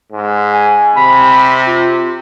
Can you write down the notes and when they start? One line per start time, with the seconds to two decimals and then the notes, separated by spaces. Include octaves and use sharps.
0.12 G#2
0.53 G#5
0.96 C3 B5
1.67 F4